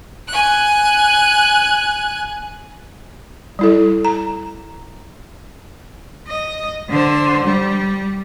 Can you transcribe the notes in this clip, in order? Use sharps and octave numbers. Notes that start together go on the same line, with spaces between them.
G#5 F#6
G3 E4 A4
A#5
D#5
D3 C5
G3